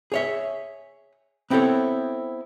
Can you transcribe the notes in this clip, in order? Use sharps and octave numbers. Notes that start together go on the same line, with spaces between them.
G#4 C#5 E5
B3 C4 E4 G4 A4 C#5